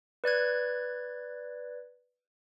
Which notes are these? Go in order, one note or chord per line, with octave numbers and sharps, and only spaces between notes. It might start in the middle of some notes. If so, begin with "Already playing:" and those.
B4 D5 F#6 G#6